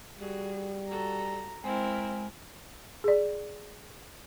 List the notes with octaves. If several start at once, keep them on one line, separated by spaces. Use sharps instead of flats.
G3 F#4 G#4
F#4 A4 A#5
G#3 C4 E4 A#4
G#4 D5